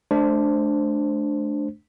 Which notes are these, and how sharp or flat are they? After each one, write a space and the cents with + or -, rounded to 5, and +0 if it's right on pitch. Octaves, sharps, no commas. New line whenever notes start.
A3 -35 D4 +0 C5 +0